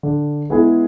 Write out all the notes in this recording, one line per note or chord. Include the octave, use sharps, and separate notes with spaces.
D3
G#3 B3 E4 G#4